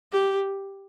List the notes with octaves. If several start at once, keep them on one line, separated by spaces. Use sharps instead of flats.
G4